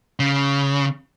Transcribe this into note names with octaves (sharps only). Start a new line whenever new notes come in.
C#3